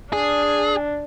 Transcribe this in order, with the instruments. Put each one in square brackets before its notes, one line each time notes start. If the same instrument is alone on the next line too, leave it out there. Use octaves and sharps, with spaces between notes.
[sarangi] D4 [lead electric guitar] G#4